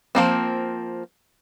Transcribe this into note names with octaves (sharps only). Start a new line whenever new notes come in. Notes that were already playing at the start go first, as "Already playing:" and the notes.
F3 A#3 C4